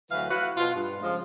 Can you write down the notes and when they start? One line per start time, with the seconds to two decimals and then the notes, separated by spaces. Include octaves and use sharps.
0.11 D2 E3 F#3 B4 F5
0.30 E4 F#4 B4 F5 F#5
0.57 B2 F4
0.75 G2
1.02 C#3 F3 G#3